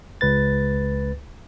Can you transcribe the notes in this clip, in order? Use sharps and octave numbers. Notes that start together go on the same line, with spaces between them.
C#2 B4 A6